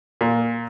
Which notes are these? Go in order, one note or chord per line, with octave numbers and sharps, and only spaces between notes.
A#2